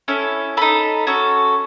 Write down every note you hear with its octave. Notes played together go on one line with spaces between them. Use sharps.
C#4 E4 A4
D#4 A4 B5
C#4 F#4 A4